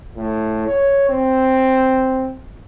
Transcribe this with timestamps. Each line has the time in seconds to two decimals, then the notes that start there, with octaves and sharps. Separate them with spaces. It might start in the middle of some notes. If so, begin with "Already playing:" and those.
0.17 A2
0.67 C#5
1.09 C4